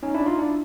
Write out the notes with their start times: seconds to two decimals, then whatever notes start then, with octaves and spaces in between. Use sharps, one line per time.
0.03 C#4 D#4
0.15 D4 E4
0.26 D#4 F4
0.38 D4 E4